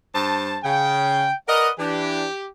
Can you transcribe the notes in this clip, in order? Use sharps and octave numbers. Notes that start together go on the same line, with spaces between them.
G2 C5 A5
C#3 G5
A#4 B4 D5 D#5 F#5
E3 D4 G4